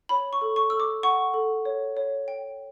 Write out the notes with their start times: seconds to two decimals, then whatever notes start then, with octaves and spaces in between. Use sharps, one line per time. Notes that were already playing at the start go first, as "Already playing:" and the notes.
0.09 C#5 B5
0.33 C#6
0.41 A4
0.56 C#6
0.70 A4 E6
0.80 D6
1.03 F#5 C#6
1.34 A4
1.65 C#5
1.97 C#5
2.28 G5